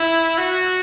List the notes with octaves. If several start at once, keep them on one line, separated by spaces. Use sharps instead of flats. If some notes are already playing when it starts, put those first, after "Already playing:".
Already playing: E4
F#4